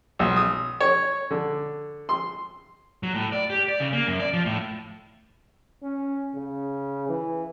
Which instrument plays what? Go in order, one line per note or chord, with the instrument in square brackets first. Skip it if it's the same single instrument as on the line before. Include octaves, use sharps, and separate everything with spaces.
[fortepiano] B1
D#6
C#5
D3
C6
[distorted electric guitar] F#3
A2
D5
G4
D5
C#3
A#3
F#2
D5
F3
A2
[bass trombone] C#4
C#3
E3